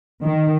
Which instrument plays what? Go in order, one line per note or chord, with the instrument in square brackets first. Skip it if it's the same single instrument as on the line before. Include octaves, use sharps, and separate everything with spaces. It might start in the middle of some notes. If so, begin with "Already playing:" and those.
[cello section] D#3